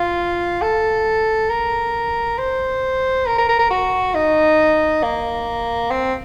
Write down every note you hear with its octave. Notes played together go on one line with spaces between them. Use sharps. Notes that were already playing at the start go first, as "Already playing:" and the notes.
Already playing: F4
A4
A#4
C5
A#4
A#4
A#4
A#4
F#4
D#4
A#3
C4